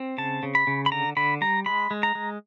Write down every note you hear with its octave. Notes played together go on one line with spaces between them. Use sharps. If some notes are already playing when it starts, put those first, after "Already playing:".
Already playing: C4
C#3 A5
C#3
B5
C#3
B5
D3 A#5
D3 B5
G3 A#5
G#3 B5
G#3
A#5
G#3